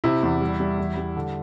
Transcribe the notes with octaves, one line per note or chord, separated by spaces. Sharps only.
C3 E4
E2
G3
G3
E2
G3
D3